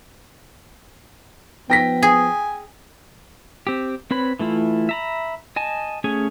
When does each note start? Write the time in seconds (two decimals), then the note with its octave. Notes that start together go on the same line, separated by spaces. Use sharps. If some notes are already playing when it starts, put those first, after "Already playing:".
1.70 F3 B3 G5 A#6 B6
2.03 G#4 G#5
3.67 C4 G4
4.11 C4 B4 C#5 B5
4.39 E3 A3 E4 F4
4.89 E5 A#5 B5
5.56 D#5 G#5 A5
6.04 A3 C#4 G#4 G#5